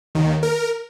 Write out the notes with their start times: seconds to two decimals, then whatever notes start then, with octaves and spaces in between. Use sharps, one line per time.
0.15 D#2 D#3
0.43 A#4